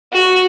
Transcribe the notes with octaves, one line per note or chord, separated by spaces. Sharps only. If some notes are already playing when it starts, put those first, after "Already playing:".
F#4